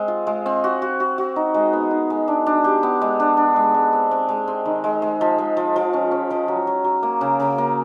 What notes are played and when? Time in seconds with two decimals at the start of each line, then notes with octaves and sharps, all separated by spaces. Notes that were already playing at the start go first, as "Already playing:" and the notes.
Already playing: G#3 C4
0.08 F4
0.27 G#3
0.46 C4
0.64 F#4
0.82 F#4
1.00 F#4
1.18 F#4
1.36 D#4
1.54 G#3
1.73 B3
1.91 D#4
2.10 G#3
2.28 D4
2.47 D4
2.64 G4
2.83 B3
3.02 G#3
3.20 D4
3.37 D4
3.56 G#3
3.74 G#3
3.93 C4
4.11 C4
4.29 G#3
4.48 C4
4.66 D#3
4.84 G#3
5.02 G#3
5.21 F3
5.38 G#3
5.57 F3
5.76 F3
5.93 C#4
6.11 C#4
6.30 F3
6.48 F#3
6.67 F#3
6.84 F#3
7.03 A#3
7.21 C#3
7.40 C#3
7.58 A#3